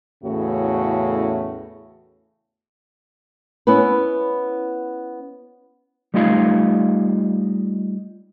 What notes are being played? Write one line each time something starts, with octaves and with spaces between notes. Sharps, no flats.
E2 A2 C#3 A3 F#4
B3 C#4 E4 B4
G3 A3 D#4 F4 D#5 F5